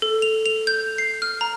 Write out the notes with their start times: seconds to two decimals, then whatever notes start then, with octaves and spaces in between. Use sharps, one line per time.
0.02 A4
0.22 F7
0.46 F7
0.67 G6
0.98 C7
1.22 F6
1.41 A#5